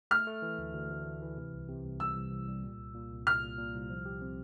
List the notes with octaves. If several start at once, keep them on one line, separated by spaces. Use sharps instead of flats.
A3 F6
A3
E3
D2
D2
D2
E3
E3
C3
C2
C3
C2
G3 E6
C2
C2
G3
A#2
C2
A#2
C2
C2 F6
A#2
A#2
C2
F3
G4
C4